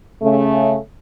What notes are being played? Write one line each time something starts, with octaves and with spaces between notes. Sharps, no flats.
C#3 A3